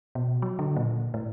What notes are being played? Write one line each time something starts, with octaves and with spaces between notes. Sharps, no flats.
B2
F#3
D3
A#2
A2